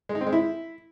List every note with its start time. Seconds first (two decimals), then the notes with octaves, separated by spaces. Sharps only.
0.09 G#3
0.15 D#4
0.21 C4
0.27 G#3
0.32 E4